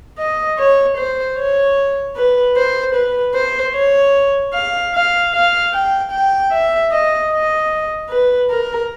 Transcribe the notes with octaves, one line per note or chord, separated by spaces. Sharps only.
D#5
C#5
C5
C#5
B4
C5
B4
C5
C#5
F5
F5
F5
G5
G5
E5
D#5
D#5
B4
A#4